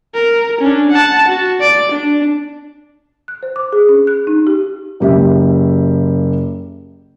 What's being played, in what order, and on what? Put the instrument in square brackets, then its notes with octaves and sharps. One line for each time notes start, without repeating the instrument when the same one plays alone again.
[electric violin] A#4
C#4 D4
F#5 A5
F#4
D5 D7
D4
[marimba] F#6
C5
D6
G#4
C#4
F#6
D#4
G4
[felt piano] F#1 G4 E5